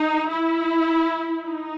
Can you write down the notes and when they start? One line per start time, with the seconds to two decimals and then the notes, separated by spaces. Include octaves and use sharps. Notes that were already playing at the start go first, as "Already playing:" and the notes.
Already playing: D#4
0.28 E4
1.45 D#4